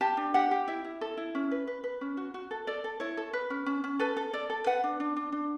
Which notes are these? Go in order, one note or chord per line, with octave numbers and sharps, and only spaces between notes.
G4 A5
D4
G4 F#5
G4
E4 E5
E4
A4
E4
C#4
B4
B4
B4
C#4
F#4
F#4
A4
A4 D5
A4
E4 C#5
A4
B4
C#4
C#4
C#4
A4 B4
A4
A4 D5
A4
B4 F#5
D4
D4
D4
D4